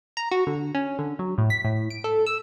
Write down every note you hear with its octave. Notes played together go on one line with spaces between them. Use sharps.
A#5
F#4
D3
C#4
D3
F#3
A2
B6
A2
D7
A4
E6